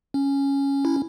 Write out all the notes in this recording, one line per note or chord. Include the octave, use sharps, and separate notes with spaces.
C#4
E4